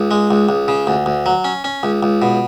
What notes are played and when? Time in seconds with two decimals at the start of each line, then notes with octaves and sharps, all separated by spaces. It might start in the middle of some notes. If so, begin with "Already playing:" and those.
Already playing: C#2
0.11 G#3
0.31 C#2
0.49 C#2
0.68 C#3
0.87 D2
1.06 D2
1.26 F#3
1.44 C#4
1.64 C#4
1.83 C#2
2.03 C#2
2.22 B2